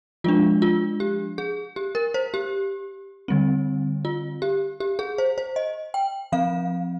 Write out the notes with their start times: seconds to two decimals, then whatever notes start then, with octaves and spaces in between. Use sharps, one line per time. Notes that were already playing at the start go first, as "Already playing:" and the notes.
0.24 F3 G#3 D4 F4
0.62 F4
1.00 G4
1.38 G#4
1.76 G4
1.95 A#4
2.14 C5
2.34 G4
3.28 D3 G3 C4
4.05 F4
4.42 G4
4.80 G4
4.99 G#4
5.18 C5
5.38 C5
5.56 D#5
5.94 G5
6.32 F3 C4 F5